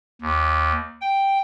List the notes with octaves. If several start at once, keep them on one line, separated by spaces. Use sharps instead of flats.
D#2
G5